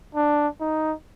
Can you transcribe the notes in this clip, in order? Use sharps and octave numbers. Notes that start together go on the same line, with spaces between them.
D4
D#4